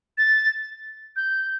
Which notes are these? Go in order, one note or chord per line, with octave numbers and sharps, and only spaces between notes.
A6
G6